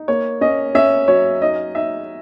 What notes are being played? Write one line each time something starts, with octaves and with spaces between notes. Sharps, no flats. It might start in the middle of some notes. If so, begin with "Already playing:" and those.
Already playing: D#4
A#3 C#5
C#4 D#5
C#4 E5
F#3 C#5
D#4 D#5
D#4 E5